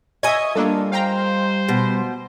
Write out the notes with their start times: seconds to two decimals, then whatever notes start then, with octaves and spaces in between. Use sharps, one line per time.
0.23 D#5 E5 G#5 C#6 D#6 G#6
0.55 G3 A#3 D4 F4 A4
0.92 C5 F5 G5 A#5
1.69 B2